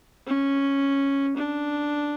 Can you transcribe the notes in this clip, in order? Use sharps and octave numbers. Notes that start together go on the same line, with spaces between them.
C#4
D4